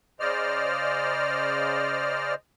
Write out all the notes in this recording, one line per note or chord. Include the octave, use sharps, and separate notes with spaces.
C#3 C5 D5 D#5 F6